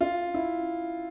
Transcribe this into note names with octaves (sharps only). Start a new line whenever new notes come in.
F4
E4